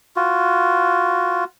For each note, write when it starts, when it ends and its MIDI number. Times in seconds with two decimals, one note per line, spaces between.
0.16 1.44 65
0.16 1.44 66